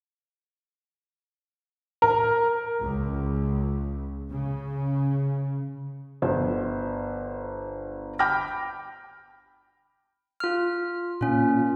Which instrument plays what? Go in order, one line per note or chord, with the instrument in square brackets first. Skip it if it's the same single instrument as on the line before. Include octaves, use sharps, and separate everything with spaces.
[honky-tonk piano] A#4
[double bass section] C#2
C#3
[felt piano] G1 C5
G5 B5 D6 F6 A#6
[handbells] F4 F6
[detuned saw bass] A#2 [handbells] C#4 F4